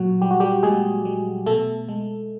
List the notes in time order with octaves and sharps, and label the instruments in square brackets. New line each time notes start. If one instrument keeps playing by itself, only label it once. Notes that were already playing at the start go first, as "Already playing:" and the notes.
Already playing: [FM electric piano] A#2 F#3 F#4
G3 G4
F#4
G3 G4
A#2 G#3 G#4
G3
B2 A3 A4
G#3